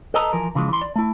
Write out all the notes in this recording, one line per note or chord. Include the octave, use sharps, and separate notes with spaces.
A4 B4 D#5 A5 A#5
E3 F3 A#4
C#3 E3 F3 G#3
E3 C6
D5
A3 E4